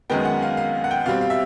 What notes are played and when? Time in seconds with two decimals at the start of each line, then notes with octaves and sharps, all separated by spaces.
0.10 F#2 D#3 G#3 B3 G5
0.25 F#5
0.42 F5
0.57 F5
0.84 F#5
0.91 G5
1.06 B2 G3 C4 F5
1.21 F5
1.30 E5